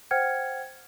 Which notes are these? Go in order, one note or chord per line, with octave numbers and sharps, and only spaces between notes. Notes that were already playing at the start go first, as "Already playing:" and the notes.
C5 F#5 G5 F6 G#6 C#7